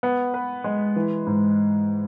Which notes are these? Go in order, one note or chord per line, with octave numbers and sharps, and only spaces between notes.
B3
B4
G#3
E3
G#2